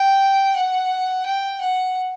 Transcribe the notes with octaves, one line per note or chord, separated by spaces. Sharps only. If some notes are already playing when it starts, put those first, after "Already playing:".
Already playing: G5
F#5
G5
F#5